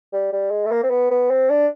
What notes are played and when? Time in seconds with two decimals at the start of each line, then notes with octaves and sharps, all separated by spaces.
0.13 G3
0.33 G3
0.51 G#3
0.66 A3
0.72 A#3
0.84 C4
0.90 B3
1.11 B3
1.31 C4
1.50 D4